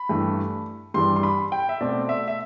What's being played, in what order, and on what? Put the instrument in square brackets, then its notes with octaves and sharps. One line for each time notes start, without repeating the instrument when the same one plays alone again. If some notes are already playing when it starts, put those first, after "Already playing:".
Already playing: [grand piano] B5
G2 E3 A3
G2 E3 G3 D4 C6
C6
B5
G5
E5
B2 A3 C4 D5
E5
E5